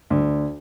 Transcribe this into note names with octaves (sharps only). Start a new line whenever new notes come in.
D2